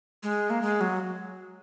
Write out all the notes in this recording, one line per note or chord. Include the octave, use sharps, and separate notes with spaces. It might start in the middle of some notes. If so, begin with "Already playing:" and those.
G#3
A#3
G#3
F#3